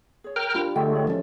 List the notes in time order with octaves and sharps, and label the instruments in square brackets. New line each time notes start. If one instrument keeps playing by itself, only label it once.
[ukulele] G#4 C#5
[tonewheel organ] A#4 G5 F6
[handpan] D4 F4 G4 [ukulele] C5 B5
[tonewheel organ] D3 G#3 A3 [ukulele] G5
[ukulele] C#5
[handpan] F3 C#4 [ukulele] A4 D5 E5